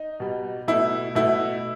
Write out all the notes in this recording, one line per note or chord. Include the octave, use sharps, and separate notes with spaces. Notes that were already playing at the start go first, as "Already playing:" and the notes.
Already playing: D#4
B2 G3
B2 A3 E4
B2 A3 E4